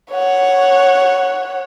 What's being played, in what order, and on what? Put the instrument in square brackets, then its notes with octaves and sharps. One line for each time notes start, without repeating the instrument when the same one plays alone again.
[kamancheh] C#5 F#5